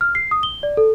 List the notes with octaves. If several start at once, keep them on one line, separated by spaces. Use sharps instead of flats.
F6
C7
D#6
G7
D5
A4